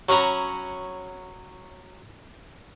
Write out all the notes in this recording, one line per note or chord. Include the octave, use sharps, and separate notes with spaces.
F#3 C#4 F#4 A#5 B5